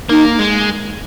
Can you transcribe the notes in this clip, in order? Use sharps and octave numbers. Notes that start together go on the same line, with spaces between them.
A#3 D#4
G#3